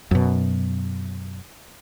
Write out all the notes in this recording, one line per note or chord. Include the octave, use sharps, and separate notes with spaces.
F#2 B2